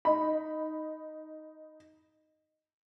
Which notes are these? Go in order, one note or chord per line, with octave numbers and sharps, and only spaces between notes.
D#4 B5